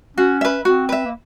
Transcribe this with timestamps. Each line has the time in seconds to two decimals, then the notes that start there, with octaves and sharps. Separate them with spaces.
0.17 C#4 F#4
0.41 B4 E5
0.65 C4 F#4
0.89 B4 E5
1.06 A#3